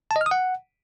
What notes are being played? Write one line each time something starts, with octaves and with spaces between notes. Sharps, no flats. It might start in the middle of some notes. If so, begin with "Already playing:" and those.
A5
D#5
F6
D#6
F#5